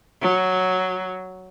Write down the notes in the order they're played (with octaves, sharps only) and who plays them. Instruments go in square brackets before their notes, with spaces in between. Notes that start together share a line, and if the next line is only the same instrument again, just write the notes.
[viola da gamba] F#3